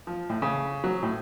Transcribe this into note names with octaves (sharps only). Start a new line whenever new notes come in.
F3
A2
C#3
F#3
A2